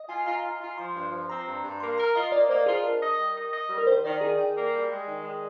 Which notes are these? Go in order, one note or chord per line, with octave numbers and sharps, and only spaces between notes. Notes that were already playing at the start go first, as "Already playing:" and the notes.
Already playing: D#5
F4 G#5
F4 A#5
F4
F4
F3 C6
G2
F3
C4 A#5
G2
G2
A#3 C6
A#4 A#5
F4 D#5
A#3 D5
A#3 C5
F4 G#4
D4 A#4
D#5
G3
D#5
D#5
G3
A#4
D#3 C5
D#3 D5
D#3 G#4
D#3 G5
A#3
G3
G#3
D#3
G#3